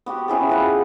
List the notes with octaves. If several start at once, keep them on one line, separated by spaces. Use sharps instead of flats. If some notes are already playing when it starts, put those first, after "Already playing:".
B3 F#4 G4
C#4 E4 G#4 A4
F4 B4 F#5